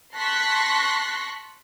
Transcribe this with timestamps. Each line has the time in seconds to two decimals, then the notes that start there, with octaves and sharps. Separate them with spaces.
0.14 A5 C6 C#6 F#6 A#6 B6